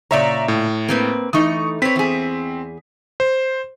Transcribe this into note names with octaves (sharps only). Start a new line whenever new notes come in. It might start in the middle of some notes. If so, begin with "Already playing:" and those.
A#2 C#3 C#5 D5 E5 A#5
A2
A#3 C4 B4
E3 A3 D#4 C#6 D#6
C4 B4 C#5 B6
E2 G#4
C5